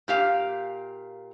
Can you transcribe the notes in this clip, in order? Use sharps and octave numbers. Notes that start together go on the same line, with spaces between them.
A#2 G4 F5